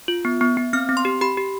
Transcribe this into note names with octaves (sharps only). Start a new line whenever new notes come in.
F4
B3
B3
B3
C4 F6
C4
C6
G4
G4 B5
G4